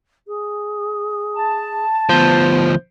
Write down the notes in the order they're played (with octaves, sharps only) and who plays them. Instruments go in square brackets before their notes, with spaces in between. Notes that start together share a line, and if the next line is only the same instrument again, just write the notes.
[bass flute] G#4
[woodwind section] A5
[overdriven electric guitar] D2 F3 [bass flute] B3 [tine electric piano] C5 G6